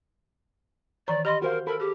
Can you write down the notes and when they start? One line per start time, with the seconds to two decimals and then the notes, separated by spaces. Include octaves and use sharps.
1.08 D#3 E3 C#5 D5 A#5
1.25 G4 D#5 B5 C6
1.42 F#4 A#4 C5 F5
1.67 A4 A#4 B5
1.80 G4 G#4